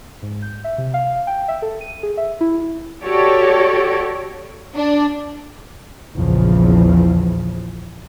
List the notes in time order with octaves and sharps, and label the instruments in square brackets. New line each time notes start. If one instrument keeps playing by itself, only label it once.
[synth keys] G#2
G6
E5
C3
F5
G5
E5
A4
D#7
G#4
E5
E4
[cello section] F#4 G4 A4 C#5 D5
[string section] D4
[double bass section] A#1 E2 C#3 F3